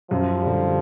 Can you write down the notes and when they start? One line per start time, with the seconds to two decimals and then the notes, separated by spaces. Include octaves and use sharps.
0.11 F#2 F3
0.42 D3 G3